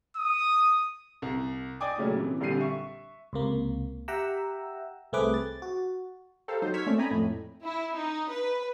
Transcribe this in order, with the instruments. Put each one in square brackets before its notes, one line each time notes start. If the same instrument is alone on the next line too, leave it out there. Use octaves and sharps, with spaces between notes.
[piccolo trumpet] D#6
[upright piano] C2
D5 D#5 G5 G#5 D6 D#6
A#2 C#3 F#3 A3 C#4
C3 E3
A#1 D3 G3 C4 C7 D#7
E5 C#6
[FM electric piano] C#2 C3 A#3
G4 E5 F#5 G5 A#5 E6
C2 A3 C4 G#4 B4 D6
A6
F#4
[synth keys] G4 A4 A#4 C5 F5
F#3 D#4 F#4 C5
C#6 E6 F6 G#6 B6
A3 A#3 C4 C#4 D5
D5 D#5 G5 G#5 A#5 B5
F2 A2
[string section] E4
D#4
B4